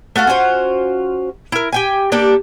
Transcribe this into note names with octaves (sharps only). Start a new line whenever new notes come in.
A3 F#4 A4 F5
C#4 F4 F#4 C5
E4 A#4
G4 G5 G#5
A#3 D4 G4 A4